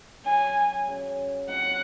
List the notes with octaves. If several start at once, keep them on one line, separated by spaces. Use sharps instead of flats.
C#3 F#3 C#4 G#5
C#3 F#3 C#4
A#2 F#3 C4 D#4 F#5